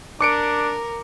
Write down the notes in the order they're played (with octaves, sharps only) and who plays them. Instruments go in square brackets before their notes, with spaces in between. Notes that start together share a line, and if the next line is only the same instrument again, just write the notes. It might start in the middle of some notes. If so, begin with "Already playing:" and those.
[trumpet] D4 [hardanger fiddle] A#4 [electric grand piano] D6 C#7 D7